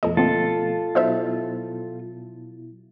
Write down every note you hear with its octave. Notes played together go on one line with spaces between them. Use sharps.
F2 B2 F3 A3 A4 D#5
D3 A#3 C4 F4 A4
B2 F#3 D#4 E4 C5 E5